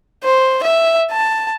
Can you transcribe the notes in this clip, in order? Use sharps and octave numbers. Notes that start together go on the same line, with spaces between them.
C5
E5
A5